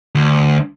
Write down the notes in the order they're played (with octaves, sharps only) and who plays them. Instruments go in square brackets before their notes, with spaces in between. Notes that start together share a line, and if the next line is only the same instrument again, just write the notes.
[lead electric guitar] D2